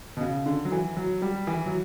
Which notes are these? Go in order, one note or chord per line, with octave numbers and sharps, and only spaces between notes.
B2
C#3
D3
F#3
E3
F#3
G3
E3
F#3